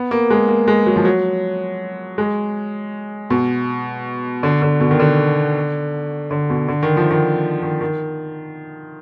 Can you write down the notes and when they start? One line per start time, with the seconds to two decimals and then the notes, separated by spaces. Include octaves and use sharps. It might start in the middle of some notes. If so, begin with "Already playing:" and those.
Already playing: B3
0.11 A#3
0.30 G#3
0.48 A#3
0.68 G#3
0.86 F#3
0.96 F3
1.05 F#3
2.18 G#3
3.30 B2
4.43 D3
4.62 D3
4.80 B2
4.91 D#3
5.00 D3
6.31 D3
6.50 B2
6.68 D3
6.83 D#3
6.97 F3
7.10 D#3
7.62 D#3
7.81 D#3